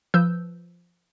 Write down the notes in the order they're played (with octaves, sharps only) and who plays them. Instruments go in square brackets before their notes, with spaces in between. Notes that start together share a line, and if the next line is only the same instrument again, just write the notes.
[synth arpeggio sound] F3 B4 E6 G6